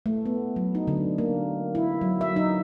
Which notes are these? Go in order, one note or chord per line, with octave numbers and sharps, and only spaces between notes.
A3
B3
F#3
D#4
D3
A#3
E4
F#3
E5
D#4